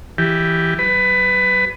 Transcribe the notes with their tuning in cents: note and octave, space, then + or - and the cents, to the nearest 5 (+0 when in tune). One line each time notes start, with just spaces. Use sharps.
E3 +0 G4 +0
F#3 +45 B4 +20